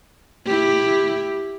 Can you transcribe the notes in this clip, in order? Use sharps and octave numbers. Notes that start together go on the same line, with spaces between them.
E4 G4